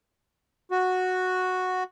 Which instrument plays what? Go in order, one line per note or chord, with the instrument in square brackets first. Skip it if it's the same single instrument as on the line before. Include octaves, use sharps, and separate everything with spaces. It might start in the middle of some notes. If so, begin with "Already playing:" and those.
[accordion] F#4